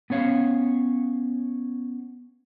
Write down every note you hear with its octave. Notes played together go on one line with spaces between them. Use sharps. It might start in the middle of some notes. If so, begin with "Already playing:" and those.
B3 C#4 C#5 F5